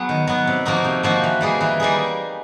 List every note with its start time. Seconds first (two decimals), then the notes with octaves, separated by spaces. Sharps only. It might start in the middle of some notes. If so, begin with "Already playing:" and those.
Already playing: F#3 B3 G#4
0.09 D#3
0.27 F#3 B3
0.47 C3
0.65 F3 A#3 D#4 F#4
0.84 C3
1.03 F3 A#3 D#4 F#4
1.24 E3
1.41 G3 A#3 D#4 G#4
1.61 E3
1.80 G3 A#3 D#4 G#4